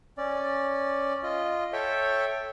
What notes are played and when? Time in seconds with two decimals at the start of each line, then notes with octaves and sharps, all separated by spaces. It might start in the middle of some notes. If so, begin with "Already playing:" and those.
0.18 C#4 D5
1.23 F4 D#5
1.73 A4 C#5 E5 G5